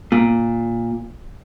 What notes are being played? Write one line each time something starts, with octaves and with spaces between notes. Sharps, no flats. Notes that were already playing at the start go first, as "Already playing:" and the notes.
A#2